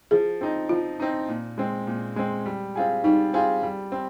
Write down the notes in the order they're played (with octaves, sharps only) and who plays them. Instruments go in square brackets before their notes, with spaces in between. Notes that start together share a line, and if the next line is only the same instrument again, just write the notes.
[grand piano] F3 [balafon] G#4
[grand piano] C4 D#4
[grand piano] F3 [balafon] F4
[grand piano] C4 D#4
A#2
G#3 C4
A#2
G#3 C4
G3
C4 F4 G#4
[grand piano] G3 [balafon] D#4
[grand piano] C4 F4 G#4
G3
C4